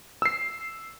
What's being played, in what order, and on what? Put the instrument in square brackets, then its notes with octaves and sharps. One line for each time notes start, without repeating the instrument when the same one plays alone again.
[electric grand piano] E6 C7